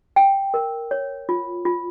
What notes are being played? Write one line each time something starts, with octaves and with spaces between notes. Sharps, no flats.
G5
A#4
C#5
F4
F4